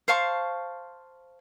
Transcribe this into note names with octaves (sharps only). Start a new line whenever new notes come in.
C5 F5 A5 C#6